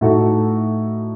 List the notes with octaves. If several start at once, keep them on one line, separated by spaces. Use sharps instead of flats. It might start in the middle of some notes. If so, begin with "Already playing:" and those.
A2 A3 D#4 F#4 A4